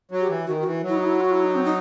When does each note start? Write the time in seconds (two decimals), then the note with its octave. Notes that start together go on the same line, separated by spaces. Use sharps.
0.11 F#3
0.20 G4
0.29 E3
0.47 D#3 F#4
0.61 F#4
0.65 E3
0.83 F#3
0.88 E4
0.96 D#4
1.05 E4
1.21 F#4
1.32 E4
1.44 D#4
1.55 C4
1.65 D#4